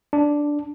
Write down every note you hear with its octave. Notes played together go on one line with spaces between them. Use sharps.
D4